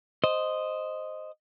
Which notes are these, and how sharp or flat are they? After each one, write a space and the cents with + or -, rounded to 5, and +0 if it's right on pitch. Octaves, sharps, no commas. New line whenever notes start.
C5 +0 D#5 +0